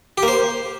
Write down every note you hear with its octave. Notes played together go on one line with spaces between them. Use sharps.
G4
A#3
C5